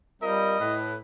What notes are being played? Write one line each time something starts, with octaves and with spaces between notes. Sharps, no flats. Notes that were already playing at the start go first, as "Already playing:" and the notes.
G3 C4 F4 A#4 D#5
A2 B4